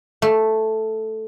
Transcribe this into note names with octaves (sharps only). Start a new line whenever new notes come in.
A3